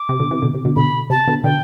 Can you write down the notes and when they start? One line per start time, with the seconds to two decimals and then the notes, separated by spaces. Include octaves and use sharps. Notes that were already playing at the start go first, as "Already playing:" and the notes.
Already playing: D6
0.09 C3
0.20 B2 D3
0.31 C3 E3
0.42 B2 D3
0.54 C3
0.65 B2 D3
0.76 B2 D3 B5
1.10 C3 A5
1.28 B2 D3
1.44 B2 D3 G5